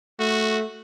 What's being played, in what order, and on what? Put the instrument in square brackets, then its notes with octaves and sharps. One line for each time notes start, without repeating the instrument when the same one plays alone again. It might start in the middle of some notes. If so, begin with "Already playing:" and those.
[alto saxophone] A3 [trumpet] F#4